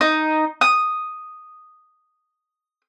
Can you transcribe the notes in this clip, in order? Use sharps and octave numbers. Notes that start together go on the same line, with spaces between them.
D#4
D#6